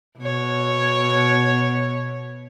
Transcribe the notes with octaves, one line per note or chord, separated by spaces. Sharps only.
B2 C#5